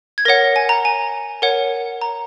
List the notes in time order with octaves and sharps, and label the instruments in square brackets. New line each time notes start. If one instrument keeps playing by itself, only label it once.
[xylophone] G#6
A#4 C#5 F#5 A#6
G#5
A#5
G#5
A#4 C#5 F#5
A#5